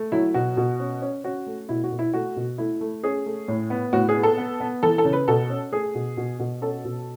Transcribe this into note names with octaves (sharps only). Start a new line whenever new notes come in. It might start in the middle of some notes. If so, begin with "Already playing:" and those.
Already playing: A3
F#3 E4
B2 F#4
B2
C#4
C#4
C#4 F#4
A3
B2 E4
F#4
B2
E4
A3 F#4
B2
A3 E4
A3
C#4 G#4
A3
A2
B3
A2 F#4
G#4
B3
A4
B3
B3
E3 A4
A4
C#3
B4
B2 A4
C#4
A3 G#4
B2
B2
B2
C#4 A4
B2